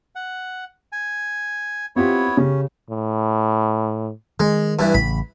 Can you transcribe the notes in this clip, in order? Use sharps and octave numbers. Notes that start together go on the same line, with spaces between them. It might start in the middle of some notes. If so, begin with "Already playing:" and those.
F#5
G#5
B3 C4 E4 F4 G4 C#5
C#3 C#4 G4
A2
D#3 G#3
G2 E3
A1 C#3 B5